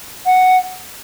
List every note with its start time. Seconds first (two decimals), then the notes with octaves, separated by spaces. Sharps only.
0.26 F#5